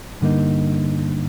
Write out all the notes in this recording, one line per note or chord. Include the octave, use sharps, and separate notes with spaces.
G2 D3 G3 A#3 D#4